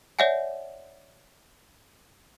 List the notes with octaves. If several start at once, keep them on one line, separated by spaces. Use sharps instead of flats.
C#5 D5 E5 F#5 G#5